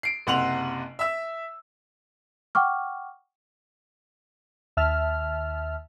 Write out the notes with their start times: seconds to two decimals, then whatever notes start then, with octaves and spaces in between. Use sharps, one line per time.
0.03 C7 D7
0.27 F#1 C3 F#5 C6 F7 F#7
0.99 E5 E6
2.55 F#5 G5 C#6 D6 F6
4.77 D#2 E5 A5 F6